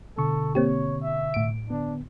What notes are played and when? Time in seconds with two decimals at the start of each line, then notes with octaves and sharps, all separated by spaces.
0.18 B2 D3 A4 C#6
0.55 A#3 C4 G4 C#5
1.03 E5
1.34 A2 D7
1.70 D3 B3 D4